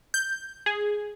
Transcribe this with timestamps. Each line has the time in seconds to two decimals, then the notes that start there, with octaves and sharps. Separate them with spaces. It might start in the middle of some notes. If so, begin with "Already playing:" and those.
0.14 G6
0.66 G#4